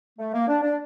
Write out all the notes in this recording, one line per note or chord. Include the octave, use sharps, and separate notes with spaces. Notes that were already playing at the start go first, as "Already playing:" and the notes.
A3
A#3
D4
D4